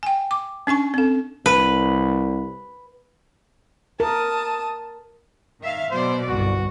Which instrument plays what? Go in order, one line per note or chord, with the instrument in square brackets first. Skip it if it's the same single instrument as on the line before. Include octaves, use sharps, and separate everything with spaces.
[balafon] G5 G#5
D6
C#4 D4 G#5 C#6
C4 A4
[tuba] C2 [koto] B4
[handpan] A#4 [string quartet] A5 D#6
[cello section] D#3 E5 F5
[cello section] B2 F#3 D5 [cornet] C5
[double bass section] G1 C2 [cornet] F#4